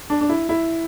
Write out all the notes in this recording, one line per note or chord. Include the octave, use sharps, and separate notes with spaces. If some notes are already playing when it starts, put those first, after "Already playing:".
D4
D4
E4
E4